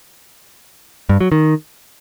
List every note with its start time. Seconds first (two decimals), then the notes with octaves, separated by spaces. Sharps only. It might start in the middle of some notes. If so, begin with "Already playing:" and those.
1.09 G2
1.21 F#3
1.32 D#3